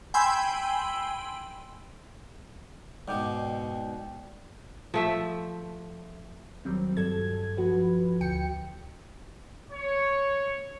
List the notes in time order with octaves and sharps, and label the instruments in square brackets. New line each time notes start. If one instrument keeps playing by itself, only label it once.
[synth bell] G5 G#5 B5 C6 E6
[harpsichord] G#2 G#3 [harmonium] B2 [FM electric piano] D5 G5 [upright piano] F#5 D6
[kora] F3 A3 E5
[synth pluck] D#2 F#3 G3 C4
G2 A4 G#6
F3 F#4 B4
D2 G5 C#7
[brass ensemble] C#5